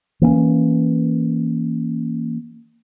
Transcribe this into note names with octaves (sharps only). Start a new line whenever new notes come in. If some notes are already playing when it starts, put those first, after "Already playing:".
E3 A#3 B3 C#4